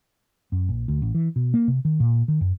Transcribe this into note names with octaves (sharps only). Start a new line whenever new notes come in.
F#2
A#1
D2
A1
E3
B2
A#3
C3
D#3
A#2
D#3
F#2